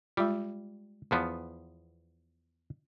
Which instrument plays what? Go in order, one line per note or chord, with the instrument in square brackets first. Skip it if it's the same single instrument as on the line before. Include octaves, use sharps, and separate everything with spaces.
[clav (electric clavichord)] G3 [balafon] G#3 F4
[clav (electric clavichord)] E2 F3 B3